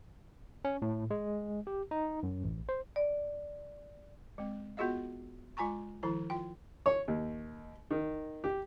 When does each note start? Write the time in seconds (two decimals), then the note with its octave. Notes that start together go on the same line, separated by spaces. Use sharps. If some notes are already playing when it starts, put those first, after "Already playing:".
0.65 C#4
0.82 A2
1.11 G#3
1.67 G4
1.91 D#4
2.23 F#2
2.44 A1
2.69 C5
2.96 D5
4.38 G#3 C4
4.77 B3 F4 F#4 G#4 D#5 F5
5.57 G#3 F4 G#5 A#5 C#6
6.03 D#3 F3 E4 A#5
6.30 F4 G5
6.86 C#5
7.08 D#2
7.91 D#3
8.44 G4